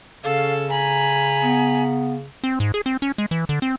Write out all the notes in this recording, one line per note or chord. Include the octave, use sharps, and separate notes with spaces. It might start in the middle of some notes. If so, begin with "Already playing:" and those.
C#3 C#4 A4 F5
G#5 A#5 B5
B3
C4
G#2
G#4
C4
C#4
G#3
E3
D3
C4